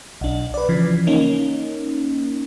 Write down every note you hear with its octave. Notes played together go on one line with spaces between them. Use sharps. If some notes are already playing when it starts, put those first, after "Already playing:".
B1 D4
B4 D5
C#3 E3 F3
A#3 C#4 D#4